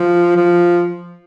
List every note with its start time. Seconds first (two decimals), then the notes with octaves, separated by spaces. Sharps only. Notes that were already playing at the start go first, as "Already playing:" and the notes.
Already playing: F3
0.36 F3